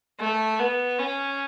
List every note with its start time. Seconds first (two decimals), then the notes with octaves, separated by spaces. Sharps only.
0.19 A3
0.59 B3
0.99 C#4